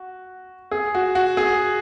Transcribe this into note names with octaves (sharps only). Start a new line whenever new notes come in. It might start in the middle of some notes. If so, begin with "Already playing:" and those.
Already playing: F#4
G#4
F#4
F#4
G#4